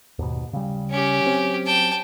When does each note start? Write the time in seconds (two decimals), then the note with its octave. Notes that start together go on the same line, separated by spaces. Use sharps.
0.19 D#2 G#2 B2
0.53 C#3 G3
0.90 C#4 G4
1.22 F#3 C4
1.67 G5 A5